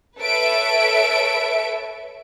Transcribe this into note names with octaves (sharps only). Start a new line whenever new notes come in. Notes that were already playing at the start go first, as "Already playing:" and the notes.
A4 B4 C#5 E5 D7